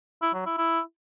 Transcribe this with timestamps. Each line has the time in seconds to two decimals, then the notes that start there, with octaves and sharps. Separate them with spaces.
0.22 E4
0.34 F#3
0.46 E4
0.58 E4